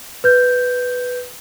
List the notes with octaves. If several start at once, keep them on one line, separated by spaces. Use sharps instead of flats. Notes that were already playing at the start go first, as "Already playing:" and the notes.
B4 G6